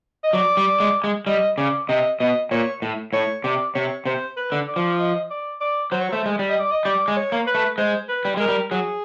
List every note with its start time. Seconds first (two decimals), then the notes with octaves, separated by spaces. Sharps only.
0.24 D#5
0.33 F#3 D5
0.57 G3
0.80 G#3
1.04 G#3
1.27 G3 D#5
1.57 C#3 D5
1.88 C3 D#5
2.19 B2 D#5
2.51 A#2 C#5
2.82 A2
3.13 A2 C#5
3.43 C3 D5
3.75 C3 C#5
4.06 C3 C5
4.37 B4
4.52 D3
4.68 D5
4.76 F3
4.99 D#5
5.30 D5
5.61 D5
5.92 F#3 C5
6.01 C#5
6.12 A3 C5
6.26 G#3
6.39 G3
6.49 D#5
6.59 D5
6.71 D#5
6.85 G3 D5
7.08 G#3
7.17 C#5
7.32 A#3
7.47 B4
7.55 A3
7.78 G#3 C5
8.09 B4
8.25 G3
8.37 G#3 A#4
8.48 G3
8.71 F#3 G#4